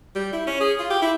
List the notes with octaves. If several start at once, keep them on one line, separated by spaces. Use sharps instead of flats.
G3
E4
C#4
G#4
F4
G4
E4